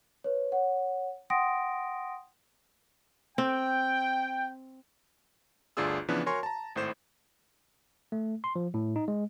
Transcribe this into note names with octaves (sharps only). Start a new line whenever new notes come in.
B4 C#5
C#5 F#5
F#5 G5 C6 D#6 A#6 D7
C4 G5
G1 D2 D4 F4 G#4 E6
C#3 E3 F3 B3 D4 B4
F#4 A#4 C#5 G#5 C6 C#6
A5 A#5
G#1 A2 C5 E7
A3
C6
F3
A2
D#4
G#3